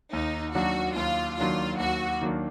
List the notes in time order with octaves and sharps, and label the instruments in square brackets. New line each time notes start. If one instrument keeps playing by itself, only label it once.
[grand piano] D#2 [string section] D#4
[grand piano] D#3 F#3 A#3 D4 [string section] F#4
[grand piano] D#2 [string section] F4
[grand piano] D#3 F#3 A#3 D4 [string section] F4
[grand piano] D#2 [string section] F#4
[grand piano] D#3 F#3 A#3 D4